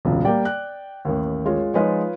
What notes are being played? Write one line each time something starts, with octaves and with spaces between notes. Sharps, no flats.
E1 C#2 A#2
G3 A#3 D5 G5
F#6
A1 D#2
G#3 F4 C#5
F3 G#3 D#4 F4 B4 C#5